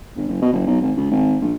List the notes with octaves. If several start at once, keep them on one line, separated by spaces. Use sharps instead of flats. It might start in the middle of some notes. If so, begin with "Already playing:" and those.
G1
F#1
B2
F#1
B1
G#1
C#2
G#1
A#1